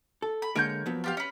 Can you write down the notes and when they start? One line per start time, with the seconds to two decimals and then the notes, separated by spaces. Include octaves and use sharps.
0.22 A4
0.42 B5
0.56 D3 G#3 A#3 A#4 C#5 G6
0.86 F3 F#3 B3
1.04 F4 G4 F5
1.17 C#4 B4